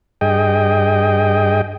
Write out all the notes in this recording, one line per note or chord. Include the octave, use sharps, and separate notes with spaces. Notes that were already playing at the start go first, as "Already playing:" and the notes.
G2 G#4 D#5 G5